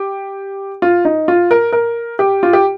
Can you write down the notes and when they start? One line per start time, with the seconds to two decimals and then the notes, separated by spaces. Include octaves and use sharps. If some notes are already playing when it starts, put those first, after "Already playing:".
Already playing: G4
0.82 F4
1.05 D#4
1.28 F4
1.51 A#4
1.73 A#4
2.19 G4
2.43 F4
2.53 G4